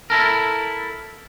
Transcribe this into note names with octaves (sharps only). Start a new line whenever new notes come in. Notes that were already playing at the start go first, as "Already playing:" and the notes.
E4 A4 A#4